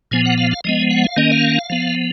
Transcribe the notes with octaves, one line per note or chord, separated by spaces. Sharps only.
A#2 F3 B3 G#5
F#5
F5
F5
F3 G#3 B3 D#5
F#5
F5
D#3 A#3 C#4 D#5
F5
F3 B3